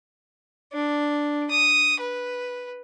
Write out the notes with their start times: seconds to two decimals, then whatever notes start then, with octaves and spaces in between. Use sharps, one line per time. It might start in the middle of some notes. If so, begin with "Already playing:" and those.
0.73 D4
1.51 D#6
2.00 B4